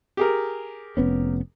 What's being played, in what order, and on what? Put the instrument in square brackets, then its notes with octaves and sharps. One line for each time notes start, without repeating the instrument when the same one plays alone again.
[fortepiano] G4 G#4 A#4
[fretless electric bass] F1 B3 C#4